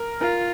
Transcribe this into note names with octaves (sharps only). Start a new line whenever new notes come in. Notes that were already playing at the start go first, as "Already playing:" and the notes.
Already playing: A#4
F4 A#4